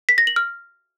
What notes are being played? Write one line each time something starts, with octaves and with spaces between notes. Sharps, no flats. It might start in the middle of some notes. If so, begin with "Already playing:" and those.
B6
A#6
F#7
F6